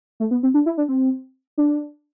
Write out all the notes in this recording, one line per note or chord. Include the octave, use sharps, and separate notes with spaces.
A3
B3
C4
D4
E4
D4
C4
D4